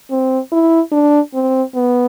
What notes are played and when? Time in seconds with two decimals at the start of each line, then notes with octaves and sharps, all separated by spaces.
0.10 C4
0.52 E4
0.92 D4
1.34 C4
1.75 B3